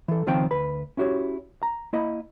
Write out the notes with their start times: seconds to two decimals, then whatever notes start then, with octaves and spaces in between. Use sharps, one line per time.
0.08 E3 A4
0.26 C#2 D#3 F3 C4 F4 G5
0.51 D2 B4 B5
0.97 C#4 E4 F#4 G4 C#5
1.63 A#5
1.93 A#3 E4 D#5 B5